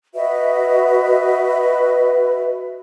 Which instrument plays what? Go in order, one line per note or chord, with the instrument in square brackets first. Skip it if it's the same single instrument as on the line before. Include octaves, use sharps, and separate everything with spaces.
[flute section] F#4 B4 D#5 E5